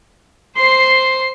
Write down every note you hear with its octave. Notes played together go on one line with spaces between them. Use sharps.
C5 C6 C7